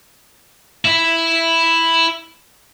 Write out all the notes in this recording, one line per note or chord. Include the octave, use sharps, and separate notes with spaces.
E4 E5